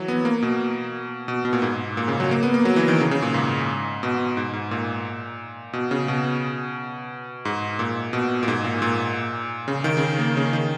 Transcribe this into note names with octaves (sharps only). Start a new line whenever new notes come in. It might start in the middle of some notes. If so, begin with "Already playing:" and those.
Already playing: E3 F#3
B3
A#3
B2
B2
B2
A#2
G#2
A#2
C#3
F#3
A#3
B3
A#3
F#3
E3
D#3
C#3
C#3
A#2
G#2
B2
G#2
G#2
A#2
B2
C#3
B2
G#2
A#2
B2
A#2
G#2
A#2
A#2
C#3
D#3
C#3
A#3
C#3
D#3